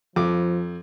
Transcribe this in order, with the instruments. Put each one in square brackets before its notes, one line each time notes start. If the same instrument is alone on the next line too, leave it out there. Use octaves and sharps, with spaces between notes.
[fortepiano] F2 D6 [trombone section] F3